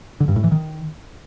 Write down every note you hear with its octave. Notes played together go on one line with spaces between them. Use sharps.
D3
G2
A2
E3
D#3